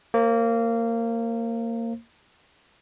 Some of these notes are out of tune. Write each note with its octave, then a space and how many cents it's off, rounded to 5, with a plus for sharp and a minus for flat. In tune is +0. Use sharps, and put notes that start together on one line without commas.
A#3 -20 C5 +25